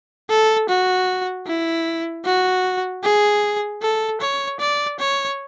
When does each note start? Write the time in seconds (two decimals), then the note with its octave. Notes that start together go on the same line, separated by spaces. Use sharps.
0.30 A4
0.69 F#4
1.47 E4
2.25 F#4
3.03 G#4
3.82 A4
4.21 C#5
4.60 D5
4.99 C#5